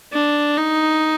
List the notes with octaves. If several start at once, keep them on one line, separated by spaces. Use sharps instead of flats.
D4
D#4